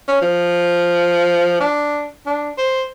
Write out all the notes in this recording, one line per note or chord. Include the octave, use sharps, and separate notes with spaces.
C#4
F3
D4
D4
C5